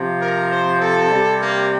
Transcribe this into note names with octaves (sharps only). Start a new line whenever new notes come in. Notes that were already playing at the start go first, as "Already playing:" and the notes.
Already playing: C3 F3
A#4
C5
A4
C3 G3
A#3